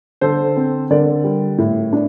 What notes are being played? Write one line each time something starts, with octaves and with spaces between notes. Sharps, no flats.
D3 A4 C5
C4
D3 A#4 D5
G3
A2
D4